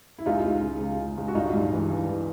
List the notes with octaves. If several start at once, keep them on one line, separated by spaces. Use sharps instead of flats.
E4
C#2 D#4 F4
C#2
C#3
C#2
C#3
C#2
F#4
G2 D#4 F4
G2
E3
E3
E3